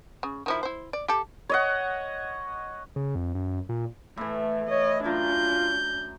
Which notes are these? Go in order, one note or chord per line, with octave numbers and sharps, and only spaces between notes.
C#3
D#3 F3 E4
E4 C5
D5
G4 A4
C#5 D#5 F#5
C#3
F2
F#2
A#2
A2 E3 A3
C#5 D#5
F#2 D4 F4 A#5 G6